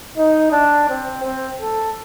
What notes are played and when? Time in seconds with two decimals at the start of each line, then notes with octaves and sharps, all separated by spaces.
0.18 D#4
0.52 D4
0.89 C4
1.23 C4
1.61 A4